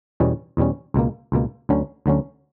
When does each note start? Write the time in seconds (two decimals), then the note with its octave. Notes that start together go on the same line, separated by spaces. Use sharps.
0.20 E2 B2 G3 C#4
0.57 E2 B2 G3 C#4
0.94 C#2 B2 A#3
1.32 C#2 B2 A#3
1.69 D2 D3 F#3 C#4
2.06 D2 D3 F#3 C#4